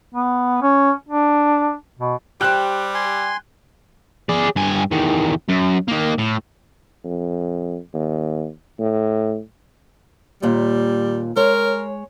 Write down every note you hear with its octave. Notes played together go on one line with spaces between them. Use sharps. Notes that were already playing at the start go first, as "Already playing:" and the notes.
B3
C#4
D4
B2
G3 G4 C5 G5 F#6
G#5 C6
G#4 D5
G2 G#5
E2 D#3
F#2
D#3 A#3
A2
F2
D#2
A2
D#2 A#2 G3
G#3 A#4 C#5